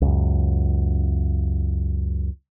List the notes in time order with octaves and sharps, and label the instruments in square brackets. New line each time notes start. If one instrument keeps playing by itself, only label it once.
[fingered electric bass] C#2 F#2